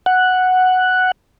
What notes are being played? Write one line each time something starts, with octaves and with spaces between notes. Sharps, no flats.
F#5